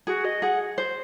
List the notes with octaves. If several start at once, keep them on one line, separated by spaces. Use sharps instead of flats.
F#4 G#4
D#5
G#4 F#5
C5